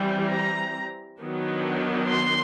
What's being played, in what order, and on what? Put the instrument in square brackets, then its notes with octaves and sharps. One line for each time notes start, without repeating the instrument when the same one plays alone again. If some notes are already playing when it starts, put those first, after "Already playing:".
Already playing: [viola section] E3 G3 C4
A#5
D#3 F#3 B3 D4
C6